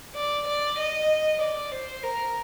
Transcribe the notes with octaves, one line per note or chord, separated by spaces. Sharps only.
D5
D5
D#5
D5
C5
A#4